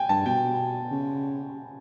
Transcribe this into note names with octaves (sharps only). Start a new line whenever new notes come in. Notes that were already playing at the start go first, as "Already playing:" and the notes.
Already playing: G5 G#5
G2 A5
B2 G5
C#3